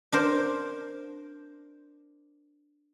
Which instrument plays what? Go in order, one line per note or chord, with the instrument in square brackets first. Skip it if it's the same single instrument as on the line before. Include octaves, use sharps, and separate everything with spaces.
[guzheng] D4 A#4 C5